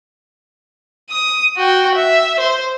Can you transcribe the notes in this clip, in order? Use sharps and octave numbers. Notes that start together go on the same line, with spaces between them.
D#6
F#4 G5
E5
C5